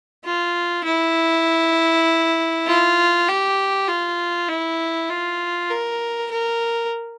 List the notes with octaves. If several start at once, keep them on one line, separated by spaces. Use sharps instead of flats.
F4
E4
F4
G4
F4
E4
F4
A#4
A#4